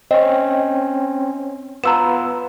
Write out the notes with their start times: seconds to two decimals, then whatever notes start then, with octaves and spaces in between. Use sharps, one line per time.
0.11 C4 C#4 D#5
1.84 B3 F4 B4 A#5 E6 E7